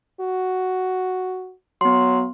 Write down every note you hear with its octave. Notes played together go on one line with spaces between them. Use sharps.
F#4
F#3 B3 C6